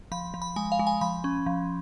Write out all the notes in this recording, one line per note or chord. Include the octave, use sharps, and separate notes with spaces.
F3 B5
F3
B5
G#3 G#5
F5
G#3
G#5
F3 B5
C#4
F3